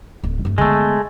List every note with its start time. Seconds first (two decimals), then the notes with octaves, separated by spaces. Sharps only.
0.23 D1
0.45 G2 A3
0.58 D3 G#3 A3 B3